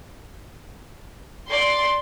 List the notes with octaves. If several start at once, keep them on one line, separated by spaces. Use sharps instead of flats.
D5 C6